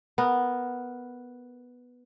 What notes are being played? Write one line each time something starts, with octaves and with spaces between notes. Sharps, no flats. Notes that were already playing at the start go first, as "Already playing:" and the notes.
B3 A#4